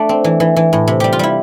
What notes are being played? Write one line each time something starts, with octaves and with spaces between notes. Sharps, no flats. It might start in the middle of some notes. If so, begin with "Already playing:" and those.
Already playing: A3 D4
C4
E3
E3
E3
A2
C3
G3 G4
F4
G3 E4